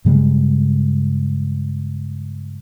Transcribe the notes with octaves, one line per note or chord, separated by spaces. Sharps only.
G2 C#3 G3 G#3